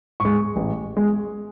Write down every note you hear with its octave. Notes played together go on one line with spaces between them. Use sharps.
G#2 G#3 C#6
A1
G#3